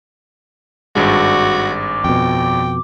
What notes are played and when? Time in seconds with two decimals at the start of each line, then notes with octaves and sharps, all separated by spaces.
0.95 G#1 G2 G#3 F#4 D6
2.04 F2 B2 G5